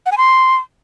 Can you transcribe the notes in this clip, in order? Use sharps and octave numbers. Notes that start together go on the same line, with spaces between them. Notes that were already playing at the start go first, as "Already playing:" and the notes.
F#5
G#5
C6